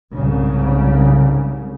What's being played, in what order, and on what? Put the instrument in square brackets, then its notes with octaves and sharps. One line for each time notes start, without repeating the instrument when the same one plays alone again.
[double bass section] C2 G#2 C#3